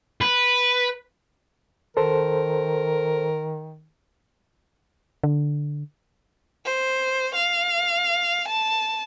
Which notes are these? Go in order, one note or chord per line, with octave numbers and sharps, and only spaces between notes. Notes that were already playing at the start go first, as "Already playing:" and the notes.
B4
D#3 A4 A#4 C5
D3
C5
F5
A5